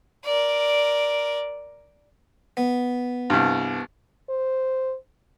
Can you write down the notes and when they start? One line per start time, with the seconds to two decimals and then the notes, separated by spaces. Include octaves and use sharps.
0.24 A#4 D5
2.57 B3
3.30 C2 G2
4.29 C5